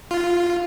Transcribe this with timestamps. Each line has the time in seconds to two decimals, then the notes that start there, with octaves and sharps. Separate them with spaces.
0.11 F4